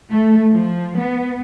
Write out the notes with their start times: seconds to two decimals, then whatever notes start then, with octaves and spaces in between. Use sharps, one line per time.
0.11 A3
0.52 F3
0.97 B3